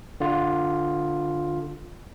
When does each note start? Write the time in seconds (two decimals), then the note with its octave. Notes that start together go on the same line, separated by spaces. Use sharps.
0.20 D3 F4